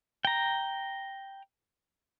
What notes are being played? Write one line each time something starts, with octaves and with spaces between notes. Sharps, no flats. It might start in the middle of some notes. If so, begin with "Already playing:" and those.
G5 A#5